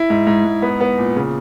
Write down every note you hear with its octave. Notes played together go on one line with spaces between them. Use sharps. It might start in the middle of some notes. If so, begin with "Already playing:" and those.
Already playing: E4
G#2
G#2
G#2
B3
B3
A#2
C#3